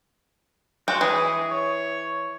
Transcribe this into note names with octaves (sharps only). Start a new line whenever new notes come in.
G#3 F#4 G5
E3 G#4
C#5